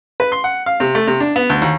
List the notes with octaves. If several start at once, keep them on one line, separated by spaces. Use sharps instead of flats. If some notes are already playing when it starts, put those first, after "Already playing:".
B4
C6
F#5
F5
C3
A3
C3
D4
B3
D2
D#2